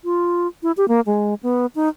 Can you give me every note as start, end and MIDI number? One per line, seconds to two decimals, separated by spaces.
0.05 0.47 65
0.63 0.72 64
0.77 0.88 67
0.88 1.01 58
1.06 1.34 56
1.43 1.66 59
1.75 1.89 63